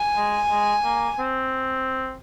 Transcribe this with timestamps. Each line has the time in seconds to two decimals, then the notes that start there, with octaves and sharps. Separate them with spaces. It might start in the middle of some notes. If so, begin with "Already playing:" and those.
Already playing: G#5
0.17 G#3
0.50 G#3
0.84 A#3
1.19 C4